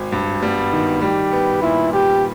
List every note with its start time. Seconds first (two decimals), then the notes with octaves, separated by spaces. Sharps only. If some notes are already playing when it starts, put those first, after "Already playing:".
Already playing: G#1
0.12 G2
0.42 G3 B3
0.73 D#3
1.02 G3 G4
1.33 B3
1.62 A#2 E4
1.93 G3 G4